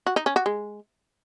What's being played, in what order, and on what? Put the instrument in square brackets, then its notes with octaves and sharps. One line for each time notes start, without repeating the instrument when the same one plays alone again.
[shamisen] F#4
D#4
C#4
F#4
G#3